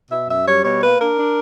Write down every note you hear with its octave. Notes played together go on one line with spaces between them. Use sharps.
B2 E5
F#2 E5
G3 C#5
B2 C#5
A#3 B4
D4 A#4
D4